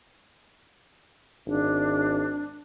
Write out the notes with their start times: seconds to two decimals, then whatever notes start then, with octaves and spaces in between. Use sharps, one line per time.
1.46 G#1 D4